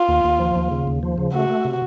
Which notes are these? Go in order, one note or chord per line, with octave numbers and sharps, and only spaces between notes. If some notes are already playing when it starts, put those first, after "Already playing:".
Already playing: F4
D#2
D#2
F3
D#2
C#3
D#2
F3
C#3
A3 F#4
A3
C3